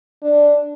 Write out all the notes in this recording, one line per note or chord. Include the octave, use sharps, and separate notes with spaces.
D4